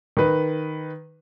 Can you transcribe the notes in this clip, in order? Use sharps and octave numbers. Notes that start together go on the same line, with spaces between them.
D#3 B4